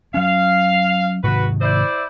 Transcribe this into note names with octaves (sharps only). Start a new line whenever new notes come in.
F#3 C#4 F5
G#2 C3 D#3 F#4 B4
E4 C5 D5